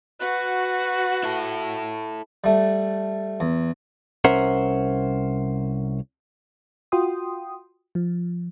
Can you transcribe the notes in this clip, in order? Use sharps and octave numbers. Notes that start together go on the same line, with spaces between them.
F#4 B4
E4 A4
G3 A3
E2
C2 C#4 A#4 C5 E5 F#5
F4 F#4 G5 C6 D#6
F3